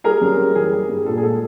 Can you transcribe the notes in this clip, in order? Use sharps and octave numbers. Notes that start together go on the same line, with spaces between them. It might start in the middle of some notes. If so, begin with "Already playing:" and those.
G3 G#4 A#4
F#2
G3
E3 G#4
G3
G2
A#2 A4
G#4
G#3 A4